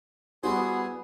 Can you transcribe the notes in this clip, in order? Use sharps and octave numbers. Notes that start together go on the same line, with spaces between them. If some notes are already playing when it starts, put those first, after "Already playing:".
G3 B3 E4 F#4 G#4 C5